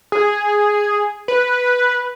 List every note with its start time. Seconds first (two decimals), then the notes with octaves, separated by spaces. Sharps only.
0.12 G#4
1.28 B4